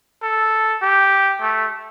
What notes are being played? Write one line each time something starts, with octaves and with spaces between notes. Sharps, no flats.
A4
G4
A3